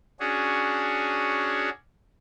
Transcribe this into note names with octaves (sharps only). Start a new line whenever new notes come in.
C#4 D4 F#4 G#4